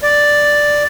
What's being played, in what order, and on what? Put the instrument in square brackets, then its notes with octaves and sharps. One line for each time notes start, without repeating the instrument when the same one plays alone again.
[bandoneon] D5